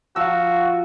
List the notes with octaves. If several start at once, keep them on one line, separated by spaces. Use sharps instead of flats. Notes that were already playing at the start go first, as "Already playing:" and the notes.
F3 F#4 F5 F#5 C#6 E6